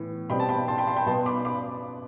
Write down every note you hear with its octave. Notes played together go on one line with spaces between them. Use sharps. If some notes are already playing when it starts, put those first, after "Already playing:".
Already playing: A2 E3 B3
B2 G3 C4 G5 B5
A5
G5 B5
A5 C6
G5 B5
A5 C6
G5 B5
B2 B3 A5 C6
B5 D6
B5 D6